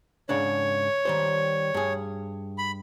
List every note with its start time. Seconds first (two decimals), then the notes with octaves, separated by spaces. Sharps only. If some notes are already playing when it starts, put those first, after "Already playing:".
0.29 G#2 C#3 D4 C#5
1.05 D#3 G3 C5
1.74 G2 G#4
2.58 B5